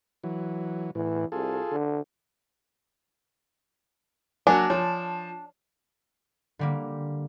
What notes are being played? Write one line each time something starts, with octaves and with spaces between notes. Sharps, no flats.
E3 F#3
A2 E3
C2 F4 G#4 A4
D3
F#3 A#3 D4 F#4 G#5
F3 C#5
D3 G3 A#3